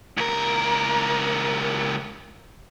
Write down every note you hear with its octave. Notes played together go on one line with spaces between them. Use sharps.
C#2 A#4